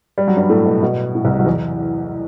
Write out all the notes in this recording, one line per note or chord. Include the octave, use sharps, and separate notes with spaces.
G3
F#3
G2 G3
A2 A3
B2
B2
A2
C2 C3
F#3
E2 E3